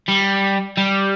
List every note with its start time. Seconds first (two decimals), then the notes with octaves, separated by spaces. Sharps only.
0.09 G3
0.78 G3